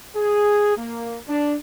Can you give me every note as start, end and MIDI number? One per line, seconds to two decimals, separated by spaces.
0.16 0.76 68
0.77 1.17 58
1.29 1.54 62